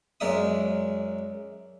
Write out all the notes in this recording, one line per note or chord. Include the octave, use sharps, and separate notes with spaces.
F#2 G#3 A#4 D5 E5 D#6